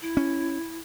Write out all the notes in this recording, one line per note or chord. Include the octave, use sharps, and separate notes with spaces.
E4
C#4